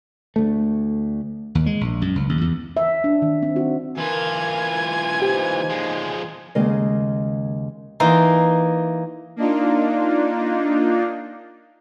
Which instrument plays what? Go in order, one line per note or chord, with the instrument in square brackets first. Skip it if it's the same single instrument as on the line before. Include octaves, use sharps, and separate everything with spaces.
[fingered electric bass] D2 A3
[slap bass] D#2
G#3
A#1
F#2
C#2
D#2
E2
[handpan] E5
D4
D#3
C4
F#4
[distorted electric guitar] E3 F4 [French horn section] A#4 [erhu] G#5
[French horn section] A#3 D#4 C5 [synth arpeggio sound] G4
[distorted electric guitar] F3 G#3
[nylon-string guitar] D#2 C#3 G#3 A#4 D#5 F5
[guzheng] E3 A#3 D#4 C6
[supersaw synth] A#3 D4 D#4 F4